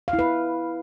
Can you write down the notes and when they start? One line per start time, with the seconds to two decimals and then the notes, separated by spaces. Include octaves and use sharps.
0.08 F5
0.13 E4
0.19 B4